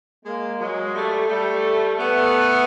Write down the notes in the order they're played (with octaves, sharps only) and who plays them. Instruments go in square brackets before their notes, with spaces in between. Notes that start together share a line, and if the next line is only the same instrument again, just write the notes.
[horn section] G#3 A#3
F#3 G#3
G3 A3
G3 A3
A3 B3